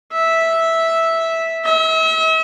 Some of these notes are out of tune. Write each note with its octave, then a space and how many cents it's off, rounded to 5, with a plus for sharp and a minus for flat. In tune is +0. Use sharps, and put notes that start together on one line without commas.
E5 -5
E5 -40